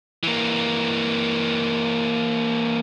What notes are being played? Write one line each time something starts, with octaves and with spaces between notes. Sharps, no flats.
E3 A#3